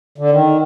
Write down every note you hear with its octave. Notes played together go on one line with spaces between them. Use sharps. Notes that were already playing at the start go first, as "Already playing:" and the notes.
D3
D#3